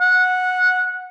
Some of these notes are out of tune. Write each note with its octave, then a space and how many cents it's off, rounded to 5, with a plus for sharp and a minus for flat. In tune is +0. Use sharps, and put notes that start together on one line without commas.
F#5 -15